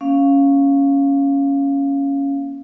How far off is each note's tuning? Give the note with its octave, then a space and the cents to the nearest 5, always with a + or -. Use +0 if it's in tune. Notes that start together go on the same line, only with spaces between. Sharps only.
A#3 +35 C#4 +0 F5 +0